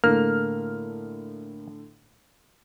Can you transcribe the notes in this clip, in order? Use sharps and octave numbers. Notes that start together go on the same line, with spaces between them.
A2 D3 A3 A#3 F6